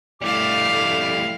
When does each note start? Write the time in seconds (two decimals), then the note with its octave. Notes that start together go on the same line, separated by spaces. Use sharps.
0.22 G3 A3 E4 F5 D6